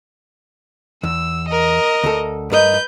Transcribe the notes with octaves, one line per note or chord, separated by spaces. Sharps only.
E2 E6
A#4 D#5
D2 A4
G2 A#4 B4 D#5 G6